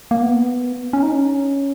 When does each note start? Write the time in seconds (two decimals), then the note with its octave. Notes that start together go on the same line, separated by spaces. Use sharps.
0.11 A#3
0.22 B3
0.93 C#4
1.03 D#4
1.12 C#4